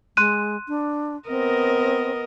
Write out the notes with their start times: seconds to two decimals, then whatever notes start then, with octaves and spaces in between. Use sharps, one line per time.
0.17 G#3 C6 F#6 D#7
0.68 D4
1.29 B3 C4 A#4 D#5